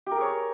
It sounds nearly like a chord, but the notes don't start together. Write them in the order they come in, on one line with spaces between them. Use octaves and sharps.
G4 A#4 G#4 C#5